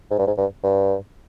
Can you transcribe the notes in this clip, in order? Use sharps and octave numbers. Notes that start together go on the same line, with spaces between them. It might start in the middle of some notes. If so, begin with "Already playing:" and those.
G#2
G2
G#2
G2
G2